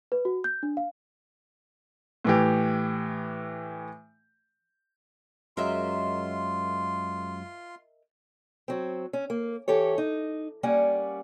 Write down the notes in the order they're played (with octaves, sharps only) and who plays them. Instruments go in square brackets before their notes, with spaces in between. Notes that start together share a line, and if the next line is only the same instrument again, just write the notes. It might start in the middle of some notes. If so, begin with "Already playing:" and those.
[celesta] B4
F#4
G6
D4
F5
[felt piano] A2 E3 G4
[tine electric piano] F#2 F#3 G#3 [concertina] F4 C6 [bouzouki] A#4 D#5 E5
[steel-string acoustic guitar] F#3 C4
C#4
A#3
E3 G4 A4 C#5
D#4
G3 A#3 C#4 D5 F#5 G#5